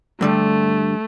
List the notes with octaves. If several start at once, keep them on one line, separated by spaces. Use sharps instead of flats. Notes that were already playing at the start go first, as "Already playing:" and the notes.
G2 D3 G3 A3